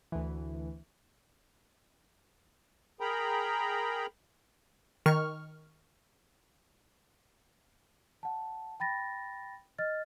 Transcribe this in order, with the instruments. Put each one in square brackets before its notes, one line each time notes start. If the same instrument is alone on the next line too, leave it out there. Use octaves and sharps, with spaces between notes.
[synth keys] D2 E3
[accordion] G#4 A#4 G5 A#5 B5
[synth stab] D#3 C#6 F6
[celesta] F#5 A5
G5 B5 A6 A#6
D#5 F6 A6